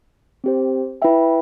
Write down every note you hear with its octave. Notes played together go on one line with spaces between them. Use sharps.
C4 G4 C5
E4 B4 E5 G5